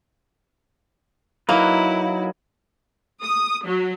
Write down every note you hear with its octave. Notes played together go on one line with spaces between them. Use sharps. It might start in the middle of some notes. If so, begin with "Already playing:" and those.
F#3 A#3 D#4 E4 B4
D#6
F#3